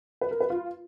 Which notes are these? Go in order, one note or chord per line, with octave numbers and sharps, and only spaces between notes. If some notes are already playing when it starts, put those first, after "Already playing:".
B4
A#4
B4
F4